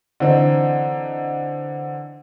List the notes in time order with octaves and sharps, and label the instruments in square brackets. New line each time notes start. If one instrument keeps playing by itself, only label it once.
[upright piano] D3 E3 C4 D#4